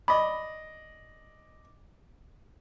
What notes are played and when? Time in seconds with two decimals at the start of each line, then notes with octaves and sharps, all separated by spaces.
0.08 D5 D#5 B5